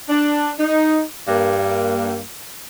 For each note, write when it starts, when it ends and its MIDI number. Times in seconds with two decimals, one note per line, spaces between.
0.09 0.52 62
0.60 1.02 63
1.28 2.20 43
1.28 2.20 58